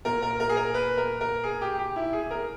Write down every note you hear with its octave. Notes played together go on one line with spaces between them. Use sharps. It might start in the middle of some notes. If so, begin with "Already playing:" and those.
A#2 A#4
A#4
A#4
G#4
A#4
B4
A#4
A#4
G#4
G4
G4
E4
G#4
A#4